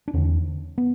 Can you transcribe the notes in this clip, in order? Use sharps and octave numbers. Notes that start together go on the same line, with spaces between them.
D4
E2 D3 C#4
B3